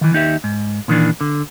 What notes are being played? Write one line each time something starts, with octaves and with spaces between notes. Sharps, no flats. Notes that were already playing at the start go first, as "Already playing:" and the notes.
D#3 E3
D#2 D#4 G4 E5
G#2
A#2 D#3 E3 D4
D3